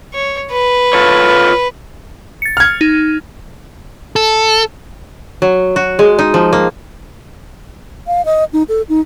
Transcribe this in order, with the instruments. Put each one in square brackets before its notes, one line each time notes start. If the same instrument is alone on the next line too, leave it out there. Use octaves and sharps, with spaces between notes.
[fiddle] C#5
B4
[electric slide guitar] F4 A4 C#5
[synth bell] A6 C#7
[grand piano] F6 G#6
[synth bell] D#4
[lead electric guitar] A4
[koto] F#3
F#4
G#3
D#4
F3
A#3
[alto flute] F5
D#5
D#4
A4
D#4